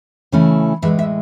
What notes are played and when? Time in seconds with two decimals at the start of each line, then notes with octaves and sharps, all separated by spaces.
0.32 C#3 E3 A3 C#4 E4
0.82 A2 E3 G#3 E5
0.99 E5